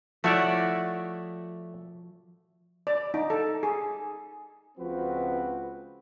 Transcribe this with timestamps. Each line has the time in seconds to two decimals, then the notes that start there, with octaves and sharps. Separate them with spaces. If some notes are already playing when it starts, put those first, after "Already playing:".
0.24 F3 A3 E4 F#4 C#5 D5 E5
2.87 D5
3.14 D#4
3.30 A4
3.63 G#4
4.78 C#2 F3 C4 F#4 B4